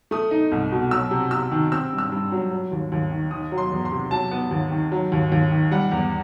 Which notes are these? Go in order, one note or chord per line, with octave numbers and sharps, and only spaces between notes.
A3 D#6
D#4
C2
B2
F#3 E6
C3
C3 E6
D#3
C4 E6
G2
E6
G2
F#3
F#3
D#2
D#2
D#3
D#3 D#6
F#3
C6
E2
C6
C3
F#3 A5
B3
D#2
D#3
F#3
D#2
D#2
D#3
G3 F#5
E2